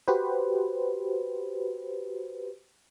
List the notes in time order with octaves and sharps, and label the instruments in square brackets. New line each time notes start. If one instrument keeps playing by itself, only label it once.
[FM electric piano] F#4 G4 B4 C5